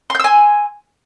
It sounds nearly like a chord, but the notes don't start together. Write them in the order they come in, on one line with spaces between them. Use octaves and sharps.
C6 G6 E6 G#5